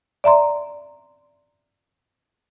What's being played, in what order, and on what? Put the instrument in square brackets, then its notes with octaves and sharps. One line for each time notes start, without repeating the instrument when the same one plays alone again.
[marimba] D5 E5 A#5 C6